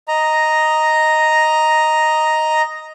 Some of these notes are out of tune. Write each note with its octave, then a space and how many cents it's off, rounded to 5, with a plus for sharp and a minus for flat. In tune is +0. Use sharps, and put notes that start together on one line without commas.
D#5 +0 A#5 +0